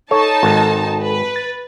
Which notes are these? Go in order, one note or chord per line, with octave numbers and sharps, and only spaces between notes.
D#4 A4 C#5 A5
G#1
B4
A6